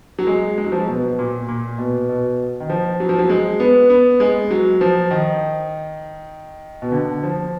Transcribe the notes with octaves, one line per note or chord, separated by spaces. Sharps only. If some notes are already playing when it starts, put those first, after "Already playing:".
F#3
G#3
G#3
F#3
F3
F#3
B2
A#2
A#2
B2
B2
D#3
F3
F#3
F3
F#3
G#3
B3
B3
G#3
F#3
F3
D#3
B2
D3
F3